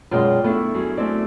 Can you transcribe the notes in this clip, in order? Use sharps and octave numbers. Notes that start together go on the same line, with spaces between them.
F#2 B2 G#3 F4 D5 G5
A3 B3 D4 E4
F#2 G#4
A3 C4 E4 D5